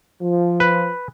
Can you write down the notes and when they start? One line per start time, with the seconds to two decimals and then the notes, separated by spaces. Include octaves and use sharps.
0.22 F3
0.60 B4